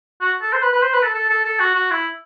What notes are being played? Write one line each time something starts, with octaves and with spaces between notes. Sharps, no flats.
F#4
A4
C5
B4
B4
C5
B4
A4
A4
A4
A4
F#4
F#4
E4